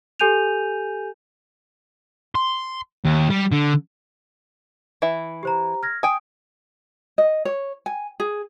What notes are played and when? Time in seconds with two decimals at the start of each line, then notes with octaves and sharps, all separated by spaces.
0.20 G4 A4 G#5 G6 D#7 F7
2.35 C6
3.05 D#2
3.30 G3
3.52 D3
5.02 E3 E5
5.43 G4 C5 A#5
5.83 F6 G#6 A#6
6.03 G5 G#5 D#6
7.18 D#5
7.45 C#5
7.86 G#5
8.20 G#4